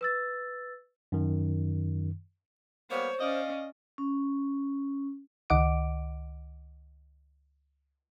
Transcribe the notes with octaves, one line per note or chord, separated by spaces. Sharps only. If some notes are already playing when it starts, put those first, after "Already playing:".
B4 E6 A6
F#2 D#3
G3 A#3 B3 C5 C#5
C#4 D5 D#5 F5
C#4
C#2 D#3 D#5 F#5 D6 D7